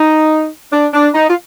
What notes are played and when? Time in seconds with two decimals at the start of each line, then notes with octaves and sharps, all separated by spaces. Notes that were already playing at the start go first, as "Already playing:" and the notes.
Already playing: D#4
0.73 D4
0.93 D4
1.14 D#4
1.29 F4